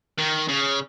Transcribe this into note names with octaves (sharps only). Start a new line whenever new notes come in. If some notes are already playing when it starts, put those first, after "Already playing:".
D#3
C#3